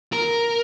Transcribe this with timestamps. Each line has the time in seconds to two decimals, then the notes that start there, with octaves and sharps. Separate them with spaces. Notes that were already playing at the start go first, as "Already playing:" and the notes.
0.13 A#4